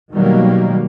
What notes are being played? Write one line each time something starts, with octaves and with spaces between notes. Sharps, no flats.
B2 D#3 F#3 G3 A#3